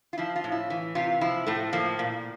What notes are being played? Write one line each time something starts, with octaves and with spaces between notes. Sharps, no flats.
F4
F3 E4
F4
A2
E4
E3
C3 F4
F3 E4
A2 A3
F3 A#3
A#2